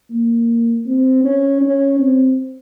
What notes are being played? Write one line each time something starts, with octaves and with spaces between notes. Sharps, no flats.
A#3
C4
C#4
C#4
C4